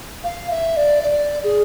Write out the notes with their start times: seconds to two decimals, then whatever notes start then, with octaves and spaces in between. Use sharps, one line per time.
0.24 F5
0.51 E5
0.77 D5
1.03 D5
1.44 G#4